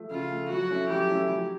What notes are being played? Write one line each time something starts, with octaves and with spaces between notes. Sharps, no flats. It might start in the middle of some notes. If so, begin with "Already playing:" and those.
Already playing: F3 A3
C#3 F4
F3 A3
F#3 F#4
A3 C#4 E4
F#3 G4
A3 C#4 E4
F#3